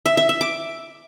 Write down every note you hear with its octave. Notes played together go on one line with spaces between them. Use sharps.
E5
E5
E5
D6